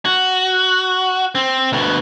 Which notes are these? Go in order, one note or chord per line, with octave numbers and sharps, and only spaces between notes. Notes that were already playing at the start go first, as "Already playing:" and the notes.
F#4
C4
D2 B2